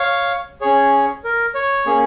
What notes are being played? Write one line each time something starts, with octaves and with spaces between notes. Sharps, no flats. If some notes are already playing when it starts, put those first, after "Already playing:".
Already playing: C#5 F5
C#4 G#4 C#5
A#4
C#5
A#3 C#4 G#4